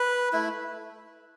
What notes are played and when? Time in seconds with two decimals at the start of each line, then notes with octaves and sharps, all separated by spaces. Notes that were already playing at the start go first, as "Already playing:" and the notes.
Already playing: B4
0.33 A3 E4